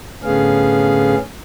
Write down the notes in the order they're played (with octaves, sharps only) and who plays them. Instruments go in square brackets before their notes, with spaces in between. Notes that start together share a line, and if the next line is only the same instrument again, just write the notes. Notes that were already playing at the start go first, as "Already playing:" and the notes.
[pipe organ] A2 D3 B3 C#4 G#4 F5